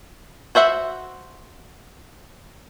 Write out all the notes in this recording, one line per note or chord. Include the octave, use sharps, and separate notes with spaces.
F#4 C5 E5 F#5